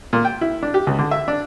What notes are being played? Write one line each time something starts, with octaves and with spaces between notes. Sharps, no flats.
A#2
G5
E4
D4
G4
C#2
D3
E5
D4